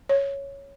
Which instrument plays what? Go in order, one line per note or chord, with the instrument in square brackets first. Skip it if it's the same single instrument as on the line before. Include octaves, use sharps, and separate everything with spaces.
[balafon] C#5